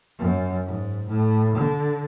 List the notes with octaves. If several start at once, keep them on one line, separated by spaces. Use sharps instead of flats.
F#2
G#2
A2
D3